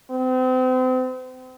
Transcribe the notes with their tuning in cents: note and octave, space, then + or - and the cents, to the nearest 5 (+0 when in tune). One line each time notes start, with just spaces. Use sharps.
C4 -35